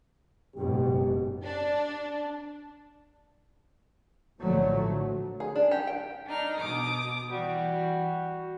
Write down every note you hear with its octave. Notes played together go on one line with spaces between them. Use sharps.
F#1 G#2 B2 G4
D4
A#1 A2 D3 F3 F#3 A3
G#4
D4
G4
G5
D4 D#4 F6
B2 D6 D#6
E3 G3 F#4